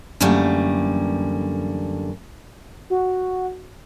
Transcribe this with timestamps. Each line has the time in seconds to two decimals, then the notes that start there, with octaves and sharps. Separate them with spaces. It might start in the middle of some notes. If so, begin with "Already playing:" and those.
0.21 F#2 D3 E3 G3 A3 A#3
2.90 F#4